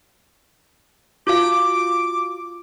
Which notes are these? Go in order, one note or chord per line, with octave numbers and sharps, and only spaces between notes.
F4 F#4 F5 D6